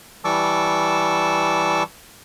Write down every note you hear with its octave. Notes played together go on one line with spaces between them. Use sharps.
E3 G3 A5 C#6 D6 E6